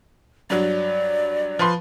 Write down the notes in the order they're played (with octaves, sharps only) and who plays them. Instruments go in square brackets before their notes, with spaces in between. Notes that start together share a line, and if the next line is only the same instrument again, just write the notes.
[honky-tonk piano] G2 F#3 [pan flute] D5
[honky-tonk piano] F3 B4 C6